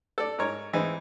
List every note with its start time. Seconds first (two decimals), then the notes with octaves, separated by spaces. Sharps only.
0.18 A4 D5
0.38 G#2 A#4 C#5
0.73 E3 G#3 C4 D#4